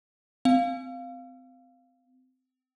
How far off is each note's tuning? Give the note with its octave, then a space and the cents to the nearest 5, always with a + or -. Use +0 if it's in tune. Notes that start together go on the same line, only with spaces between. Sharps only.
C4 -30 F5 +0